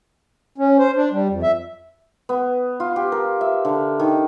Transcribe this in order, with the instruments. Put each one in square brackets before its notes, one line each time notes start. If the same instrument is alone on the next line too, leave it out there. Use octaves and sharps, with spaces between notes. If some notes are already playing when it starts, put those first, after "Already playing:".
[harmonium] C#4
C5
D4
G3
F2
E5
[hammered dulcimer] B3
F4
G4
A#4
E5
D3
D#3